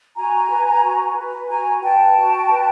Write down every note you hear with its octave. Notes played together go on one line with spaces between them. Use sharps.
F#4 G#5 A#5
B4
F#4
B4
F#4 G#5 A#5
B4 G5 A5
F#4
B4